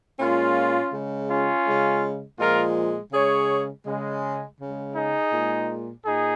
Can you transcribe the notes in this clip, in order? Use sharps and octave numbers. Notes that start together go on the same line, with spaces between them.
A#2 G#3 C#4 F4
C#3 G#3
C#4 F4
C#3 G#3
A#2 F3 G#3 F4 A#4
C#3 G#3 G#4 C#5
C#3 G#3
C#3
G#3
D#4 G#4
A#2 G#3
A#2 D#4 G#4